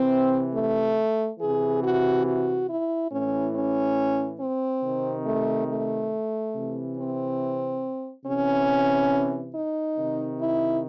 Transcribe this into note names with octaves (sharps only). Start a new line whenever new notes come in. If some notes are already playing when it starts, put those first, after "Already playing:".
Already playing: C3 E3 C4
A3
C3 E3 G#4
F#4
F#4
E4
A2 E3 C#4
C#4
C4
C3 D#3
A3
A3
C3 E3
C4
C3 E3 C#4
D#4
C3 D#3
E4